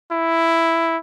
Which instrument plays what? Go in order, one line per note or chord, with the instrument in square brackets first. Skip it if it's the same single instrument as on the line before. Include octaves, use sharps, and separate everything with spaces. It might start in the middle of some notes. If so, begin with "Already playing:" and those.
[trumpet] E4